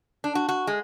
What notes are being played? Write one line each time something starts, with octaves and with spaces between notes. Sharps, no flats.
D4
F#4
F#4
G#3